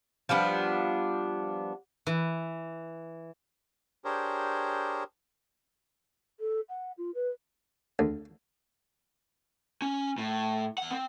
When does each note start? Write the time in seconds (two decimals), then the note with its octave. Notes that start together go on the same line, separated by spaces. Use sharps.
0.29 F3 G3 B3 D4
2.07 E3
4.05 D4 G4 G#4 A#4 C5 C#5
6.40 A4
6.69 F#5
6.97 F4
7.14 B4
7.99 D2
9.82 C#4
10.18 A2
10.78 E2 F#5
10.91 C4